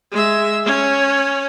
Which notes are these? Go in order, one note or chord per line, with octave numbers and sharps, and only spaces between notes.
G#3 E5
C#4 C#5